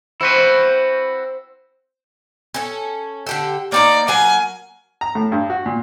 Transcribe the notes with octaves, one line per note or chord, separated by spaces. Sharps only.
C4 E4 F#4 B4
C#4 A4
D3 G4 A4
A#3 D#4 D5 A#5
F#3 A#3 G#5
A#5
A2
G2
F#4
A#2